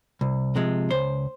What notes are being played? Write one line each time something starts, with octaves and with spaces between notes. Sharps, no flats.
C2
C3 F3 G#3
C#2 C5